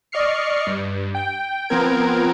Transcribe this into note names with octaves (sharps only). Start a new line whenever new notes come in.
D5 D#5 C#6 F6 C7 C#7
G2
G5
F3 B3 C4 A#4 G#6 D7